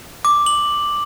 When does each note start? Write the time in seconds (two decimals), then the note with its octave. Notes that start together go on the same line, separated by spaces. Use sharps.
0.25 D6
0.46 F#7